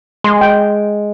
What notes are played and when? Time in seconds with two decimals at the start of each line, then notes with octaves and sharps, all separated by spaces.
0.24 G#3 C6
0.41 G5